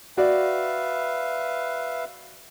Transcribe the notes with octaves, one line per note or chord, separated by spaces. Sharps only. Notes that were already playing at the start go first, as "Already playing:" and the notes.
F#4 B4 D5 E5 F5